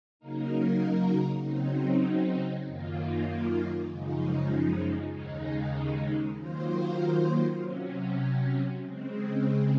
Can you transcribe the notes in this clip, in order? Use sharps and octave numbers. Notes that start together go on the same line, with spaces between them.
C#3 F#3 A#3 D#4 A#4
C#3 F#3 C4 D#4
F#2 D#3 A#3 F4
F#2 C#3 F3 G#3 D#4
D#2 C#3 G#3 D#4
D#3 F#3 A#3 F4 C5
C3 F#3 C#4
C#3 G#3 C4